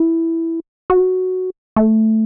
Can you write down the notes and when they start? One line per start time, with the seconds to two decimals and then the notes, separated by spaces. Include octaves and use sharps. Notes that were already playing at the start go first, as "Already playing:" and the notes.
Already playing: E4
0.90 F#4
1.76 A3